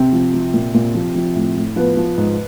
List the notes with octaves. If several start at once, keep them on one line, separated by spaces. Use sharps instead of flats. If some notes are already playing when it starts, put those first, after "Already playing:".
Already playing: C3 C4
F3
F3
A#2
A#2
F3
F3
A2
A2
F3 B3
F3
G#2